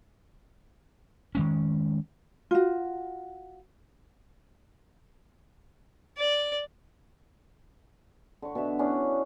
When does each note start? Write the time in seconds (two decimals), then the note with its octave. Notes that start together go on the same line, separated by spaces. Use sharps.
1.35 D#3 G#3 C#4
2.51 F4 F#4
6.18 D5
8.42 D3 C#6
8.55 B2 D4 E5
8.79 B3 C#4 D4 E4